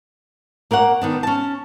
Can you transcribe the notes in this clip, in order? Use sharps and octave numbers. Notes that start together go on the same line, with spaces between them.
A#3 A#4 C#5 F#5
D#3 B3 D4
C#4 A5